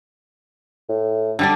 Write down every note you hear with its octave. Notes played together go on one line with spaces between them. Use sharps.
A2
D3 G3 D4